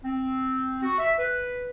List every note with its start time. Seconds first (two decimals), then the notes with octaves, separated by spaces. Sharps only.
0.03 C4
0.81 F#4
0.98 E5
1.17 B4